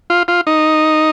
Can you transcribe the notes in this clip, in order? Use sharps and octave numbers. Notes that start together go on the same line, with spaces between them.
F4
F4
D#4